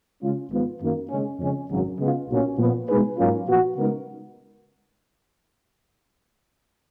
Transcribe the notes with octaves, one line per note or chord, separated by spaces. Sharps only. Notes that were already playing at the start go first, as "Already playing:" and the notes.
C#3 G#3 C#4 F4
G#1 G#2 F3 B3 F4
F#2 D#3 A#3
C#3 G#3 C#4
F2 C#3 G#3 C#4
G#1 F#2 C#3 F#3
C#3 G#3 B3 F4
B1 A#2 F#3 A#3 C#4
A#2 F3 B3
B2 G#3 D#4 G#4 B4
G#2 F#3 A#3 C#4 F4
A#2 F3 B3 F#4
C#3 G#3 B3 D#4 A#4